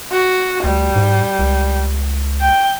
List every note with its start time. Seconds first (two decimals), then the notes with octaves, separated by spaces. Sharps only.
0.12 F#4
0.64 D2 G3
0.96 G#2
1.39 C#2
2.41 G5